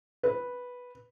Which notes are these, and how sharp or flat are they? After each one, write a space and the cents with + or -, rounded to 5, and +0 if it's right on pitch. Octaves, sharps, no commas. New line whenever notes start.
B4 -5